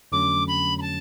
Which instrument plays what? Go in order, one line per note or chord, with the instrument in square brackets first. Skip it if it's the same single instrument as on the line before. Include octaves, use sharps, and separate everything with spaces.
[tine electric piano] F2 D3 F#3 A3 C#4 [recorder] D6
[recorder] B5
B5
A5